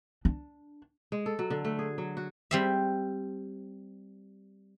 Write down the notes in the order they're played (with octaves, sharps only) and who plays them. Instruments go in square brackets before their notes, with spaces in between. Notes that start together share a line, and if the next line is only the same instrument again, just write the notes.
[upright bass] D4
[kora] G#3
A4
F#3
D3
A3
G#4
F#3
F#4
[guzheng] G3 C4 E5